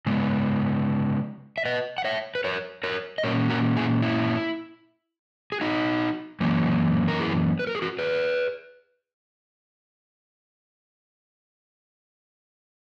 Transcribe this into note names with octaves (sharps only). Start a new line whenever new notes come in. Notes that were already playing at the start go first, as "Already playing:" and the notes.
C#3 G#3 B3
E5
B4 D#5
F#5
C#5 E5
B4
A#4 C#5
A#4 C#5
D#5
A#2 A#3 C#4 A#4 C#5
F#4 A#4
E4 G#4
E4
G#4
D#4 F#4
F#2 E3 A#3 C#4
A#4
E4 G#4
B4
A#4
G#4
F#4 A#4
G#4 B4